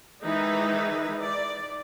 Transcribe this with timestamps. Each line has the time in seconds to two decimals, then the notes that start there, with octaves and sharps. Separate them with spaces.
0.23 D#3 E3 G#3 D#4 B4
1.20 D5